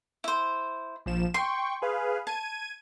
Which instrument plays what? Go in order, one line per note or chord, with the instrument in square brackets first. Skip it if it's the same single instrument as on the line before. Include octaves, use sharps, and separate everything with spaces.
[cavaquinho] E4 C5
[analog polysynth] A#1 F3 E7
[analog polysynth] G5 C#6 [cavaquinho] C6
[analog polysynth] G#4 B4 F5
[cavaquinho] A5 [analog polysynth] G#6 D#7